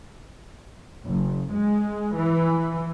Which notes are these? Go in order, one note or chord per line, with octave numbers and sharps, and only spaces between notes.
F#1
G#3
E3